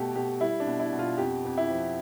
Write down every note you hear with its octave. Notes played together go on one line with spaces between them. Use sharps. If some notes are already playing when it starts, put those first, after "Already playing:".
Already playing: B2 A3 G4 A4
B2 G4
G3 E4
D4
B2
E4
B2
F4
F2 G4
F2
E4
F3